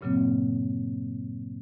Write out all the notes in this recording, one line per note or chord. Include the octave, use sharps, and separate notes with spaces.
G2 A#2 C#3 F#3 A#3 C4